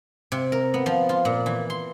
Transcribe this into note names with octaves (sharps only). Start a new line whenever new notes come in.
C3
A#4
B3
F3
F4
A#2
E3
C6